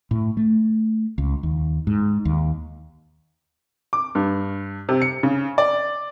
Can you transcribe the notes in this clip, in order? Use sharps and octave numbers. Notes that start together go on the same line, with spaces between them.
A2
A3
C#2
D#2
G#2
D#2
D6
G2
C3
C#7
C#3
D5